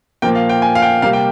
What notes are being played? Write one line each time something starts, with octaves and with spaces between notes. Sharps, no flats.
A#2 F3 A#3 G5
F5
G5
G#5
F5
G5
C3 G3 A#3 F5
G5